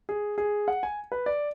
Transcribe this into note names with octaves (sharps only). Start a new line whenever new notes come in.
G#4
G#4
F#5
G#5
B4
D5